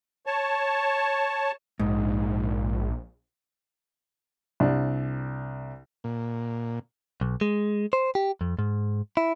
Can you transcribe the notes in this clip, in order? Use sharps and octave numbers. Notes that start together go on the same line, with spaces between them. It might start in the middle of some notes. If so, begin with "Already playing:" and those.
C#5 A5
A#1 G#2
C2 D4
A#2
B1
G#3
C5
G4
F2
G#2
E4